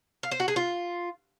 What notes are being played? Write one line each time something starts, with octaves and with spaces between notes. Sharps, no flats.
F5
C5
F#4
G#4
F4